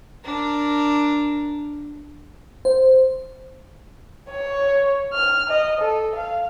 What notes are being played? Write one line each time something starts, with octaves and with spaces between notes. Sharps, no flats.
D4 A#4
C5
C#5
F6
D#5
A4
F5